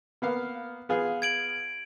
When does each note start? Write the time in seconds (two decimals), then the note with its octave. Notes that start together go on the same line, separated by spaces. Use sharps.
0.22 A#3 B3 F5
0.89 B3 F4 G#4
1.22 G#6 D7 F#7